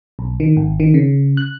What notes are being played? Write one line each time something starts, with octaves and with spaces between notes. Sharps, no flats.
B1
D#3
G#1
D#3
C#3
F#6